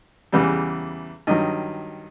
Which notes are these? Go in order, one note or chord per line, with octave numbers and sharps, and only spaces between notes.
E2 C#3 E3 G3
G2 D#3 F#3 D#5